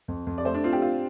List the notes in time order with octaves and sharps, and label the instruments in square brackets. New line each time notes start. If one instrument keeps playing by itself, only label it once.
[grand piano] F2
F2
[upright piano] D5
[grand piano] A3 [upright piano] C5
[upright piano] D4
[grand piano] C4 [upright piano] F4
[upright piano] G4
[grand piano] F4